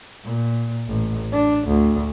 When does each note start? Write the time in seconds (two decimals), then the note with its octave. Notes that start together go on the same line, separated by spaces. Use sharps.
0.25 A#2
0.87 A1
1.33 D4
1.68 D2